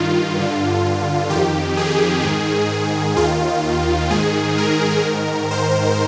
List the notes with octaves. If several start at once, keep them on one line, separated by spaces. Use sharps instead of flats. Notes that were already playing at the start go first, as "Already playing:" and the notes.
Already playing: G2 D#3 F4
G2 D3
F2 D#3 G4
G#4
G#2 D#3
D#2 D#3 F4
G#2 D#3 G#4
A#4
G#2 D#3
C5